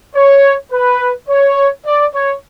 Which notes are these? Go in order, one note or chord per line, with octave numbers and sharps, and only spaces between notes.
C#5
B4
C#5
D5
C#5